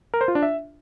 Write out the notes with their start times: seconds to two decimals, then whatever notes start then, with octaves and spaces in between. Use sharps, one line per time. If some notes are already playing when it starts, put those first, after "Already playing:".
0.14 A#4
0.21 C5
0.28 F4
0.35 D4
0.43 E5